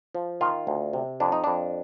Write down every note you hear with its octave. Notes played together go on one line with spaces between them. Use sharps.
F3
D#3 F4
D2
C3
F2 D4
D#4
F2 D4